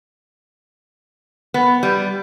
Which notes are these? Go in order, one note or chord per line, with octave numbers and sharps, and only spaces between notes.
B3
G3